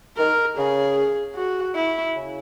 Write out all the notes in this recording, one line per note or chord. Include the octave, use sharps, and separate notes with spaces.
D#3 A#4
C#3 G#4
F#4
E4
C#3